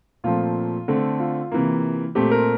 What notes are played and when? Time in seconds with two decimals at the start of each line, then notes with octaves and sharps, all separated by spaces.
0.24 A#2 F3 A3 C4 F4
0.88 D3 A3 C4
1.20 F4
1.52 C3 E3 A#3
2.15 A#2 A3 C4 G4
2.31 A#4